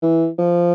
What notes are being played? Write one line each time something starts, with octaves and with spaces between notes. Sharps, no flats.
E3
F3